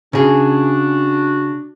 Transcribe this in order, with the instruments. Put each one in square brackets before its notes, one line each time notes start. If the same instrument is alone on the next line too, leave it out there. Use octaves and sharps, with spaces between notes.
[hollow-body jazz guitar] C#3 G#4 [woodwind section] D4 F#4